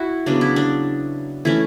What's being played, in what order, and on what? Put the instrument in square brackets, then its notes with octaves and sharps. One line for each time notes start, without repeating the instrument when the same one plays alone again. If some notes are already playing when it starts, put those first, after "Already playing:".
Already playing: [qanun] E4 F#4
C#3 F#3 B3 D4
E4
D4
E3 A3 C#4 E4